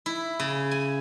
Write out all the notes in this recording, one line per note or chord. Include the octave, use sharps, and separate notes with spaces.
E4
C#3
G#5